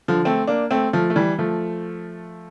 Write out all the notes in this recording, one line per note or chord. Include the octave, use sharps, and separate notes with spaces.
D3 F3
A3 C4
A#3 D4
A3 C4
F3 A3
A3
E3 G3
F3 A3